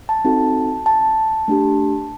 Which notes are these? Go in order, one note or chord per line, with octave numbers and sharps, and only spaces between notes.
A5
C4 D#4 F#4 A4
A5
A3 D4 G4